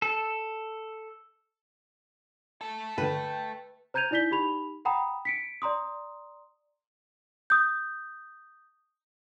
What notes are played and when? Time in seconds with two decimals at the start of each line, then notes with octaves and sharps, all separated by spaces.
0.02 A4
2.61 A3 A4
2.98 G2 D3 B4 G5
3.94 C5 A#5 G6 G#6 D#7 F7
4.11 D#4 E4 D5 G6 B6 G7
4.31 D#4 G4 B5 F7
4.85 F#5 G5 A#5 B5 D#6
5.25 B6 C#7 D7
5.62 D5 A#5 C6 D#6
7.50 D#6 G6